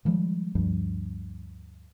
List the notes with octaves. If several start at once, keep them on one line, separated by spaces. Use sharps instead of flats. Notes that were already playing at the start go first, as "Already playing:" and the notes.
D#3 F3 G3 G#3
D2 G2 F3 G3